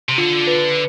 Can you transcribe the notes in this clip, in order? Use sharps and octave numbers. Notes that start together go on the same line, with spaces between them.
C3
D3 F4
B4